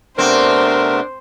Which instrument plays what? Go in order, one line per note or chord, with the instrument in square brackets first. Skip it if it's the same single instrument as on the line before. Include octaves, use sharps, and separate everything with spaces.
[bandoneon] C3 A3 B3 [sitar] C4 [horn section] D4 A#4 [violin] C5